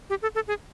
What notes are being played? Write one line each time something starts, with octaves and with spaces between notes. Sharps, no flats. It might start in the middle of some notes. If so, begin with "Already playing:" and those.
G4
A4
A4
G#4